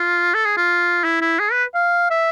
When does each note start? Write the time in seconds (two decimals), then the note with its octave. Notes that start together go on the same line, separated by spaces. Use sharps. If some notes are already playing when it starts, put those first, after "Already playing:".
Already playing: F4
0.34 A4
0.45 G#4
0.57 F4
1.04 E4
1.21 E4
1.39 G#4
1.52 B4
1.75 F5
2.10 E5